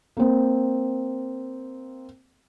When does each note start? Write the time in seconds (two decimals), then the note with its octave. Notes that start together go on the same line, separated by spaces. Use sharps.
0.17 A#3 C4